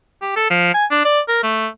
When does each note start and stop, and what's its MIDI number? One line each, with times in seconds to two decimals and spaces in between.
0.22 0.32 67
0.36 0.49 69
0.50 0.73 53
0.74 0.85 80
0.91 1.00 62
1.05 1.20 74
1.28 1.42 70
1.43 1.67 57